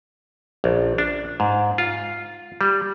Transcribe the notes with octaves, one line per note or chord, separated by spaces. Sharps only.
A#1
D4
G#2
F4
G3